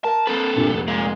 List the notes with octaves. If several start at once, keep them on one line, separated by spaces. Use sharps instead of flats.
A#4 A5
A#3 C4 A4 B4
C2 G2 A#2
F1
A#2 G#3